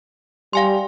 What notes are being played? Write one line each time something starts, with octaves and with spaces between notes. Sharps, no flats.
G3 F5 G#5 C6